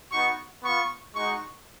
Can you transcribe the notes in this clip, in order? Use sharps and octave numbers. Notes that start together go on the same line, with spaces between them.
B3 D#4 F#4 C#6
B3 F4 C#6
G#3 D#4 F#4 C#6